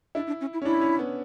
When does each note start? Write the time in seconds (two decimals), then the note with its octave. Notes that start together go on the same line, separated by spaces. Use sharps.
0.15 D4 E4
0.27 D4
0.41 C#4
0.53 E4
0.62 C#4
0.65 D4 E4
0.81 C#4
0.99 B3